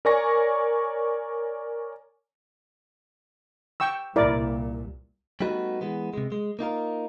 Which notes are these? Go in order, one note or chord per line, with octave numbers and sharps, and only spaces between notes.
A#4 C#5 D5 G#5 C#6 A#6
G5 C#6 E6
C2 A#2 E4 A#4 D5
G3 A3 B3 D#4 F#4 B4
E3 G#3 B3
C3 G#3
G#3
A#3 D#4 F4 A#4